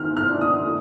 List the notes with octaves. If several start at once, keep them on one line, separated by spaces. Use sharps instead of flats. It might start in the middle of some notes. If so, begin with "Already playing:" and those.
Already playing: D#3 F6
F6
D4
D#6
A3